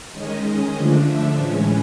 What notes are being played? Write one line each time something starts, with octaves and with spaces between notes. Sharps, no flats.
D#3 G#3 C#4 D#5
D3 F3 A3 D4
E5
A2 E3 G#3 C#4